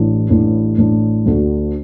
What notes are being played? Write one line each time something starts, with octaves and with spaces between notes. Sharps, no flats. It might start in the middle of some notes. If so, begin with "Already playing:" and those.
Already playing: A1 A2 E3 D4
A1 A2 E3 D4
A1 A2 E3 D4
D2 D3 A3 F#4